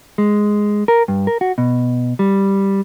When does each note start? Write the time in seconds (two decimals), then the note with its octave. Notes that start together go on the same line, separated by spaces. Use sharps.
0.18 G#3
0.88 A#4
1.08 G2
1.27 A#4
1.41 F#4
1.58 B2
2.19 G3